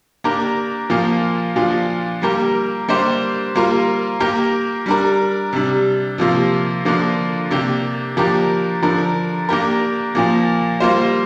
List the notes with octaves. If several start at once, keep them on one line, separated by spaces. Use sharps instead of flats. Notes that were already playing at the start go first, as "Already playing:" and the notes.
A#3 D4 G4 A#4
A#2 F3 A#3 F4
A#2 F3 D4 F4
G3 A#3 G4 A#4
G3 A#3 D4 G4 C5
G3 A#3 F4 A#4
A#3 G4 A#4
G3 D4 A#4
C3 G3 D4
C3 F3 A#3 F4
D3 F3 A#3 D4 F4
C3 A#3 D4 G4
F3 A#3 D4 G4 A#4
D3 F3 D4 A#4
A#3 D4 G4 A#4
A#2 F3 A#3
G3 A#3 F4 C5